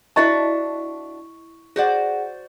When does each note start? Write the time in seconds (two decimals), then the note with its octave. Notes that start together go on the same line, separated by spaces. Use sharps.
0.16 D4 E4 F#4 D#5 E5 A5 C#6
1.76 F#4 G#4 C5 D5 F#5